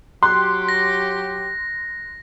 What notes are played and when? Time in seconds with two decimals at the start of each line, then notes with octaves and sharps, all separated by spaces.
0.23 F#3 G4 C6 F#6
0.69 A#6